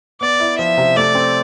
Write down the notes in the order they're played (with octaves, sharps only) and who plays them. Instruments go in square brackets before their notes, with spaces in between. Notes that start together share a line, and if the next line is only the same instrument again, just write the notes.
[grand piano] B3 [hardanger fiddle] D5
[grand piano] E4
[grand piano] F3 [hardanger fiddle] E5
[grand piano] C3
[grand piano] A3 [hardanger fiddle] D5
[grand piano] C4